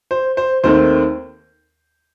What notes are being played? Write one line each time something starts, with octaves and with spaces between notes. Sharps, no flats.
C5
C5
D#2 D#3 A3 C4 C5